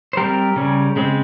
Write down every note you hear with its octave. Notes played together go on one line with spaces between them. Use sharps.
C5
G3 C4 G4 A#4
C#3 G3 C#4
C#3 G#3 C4